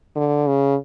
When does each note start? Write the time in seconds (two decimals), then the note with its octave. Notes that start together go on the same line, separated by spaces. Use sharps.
0.16 D3
0.47 C#3